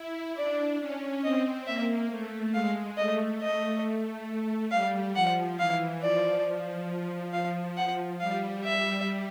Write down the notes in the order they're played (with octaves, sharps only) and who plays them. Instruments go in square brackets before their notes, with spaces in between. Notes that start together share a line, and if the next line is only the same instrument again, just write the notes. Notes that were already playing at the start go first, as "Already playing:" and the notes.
Already playing: [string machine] E4
[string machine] D4 [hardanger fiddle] D5
[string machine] C#4
[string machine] C4 [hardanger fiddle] D#5
[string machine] A#3 [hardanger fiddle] E5
[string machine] A3
[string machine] G#3 [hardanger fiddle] F5
[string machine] A3 [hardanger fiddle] D#5
[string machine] A3 [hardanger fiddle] D#5
[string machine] A3
[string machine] G3 [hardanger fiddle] F5
[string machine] F3 [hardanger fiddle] F#5
[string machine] E3 [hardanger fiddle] F5
[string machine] F3 [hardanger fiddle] D5
[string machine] F3
F3
[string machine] F3 [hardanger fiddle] F5
[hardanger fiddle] F#5
[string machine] G3 [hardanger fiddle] F5
[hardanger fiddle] E5